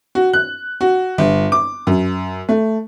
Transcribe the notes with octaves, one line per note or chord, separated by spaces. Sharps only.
F#4
F#6
F#4
G1
D6
F#2
A3